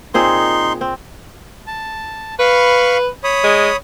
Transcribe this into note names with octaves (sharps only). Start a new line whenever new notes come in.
A#2 C4 D#4 G#4 C6
C4
A5
B4 F5 B5 C#6
C#5 B5 D#6
G#3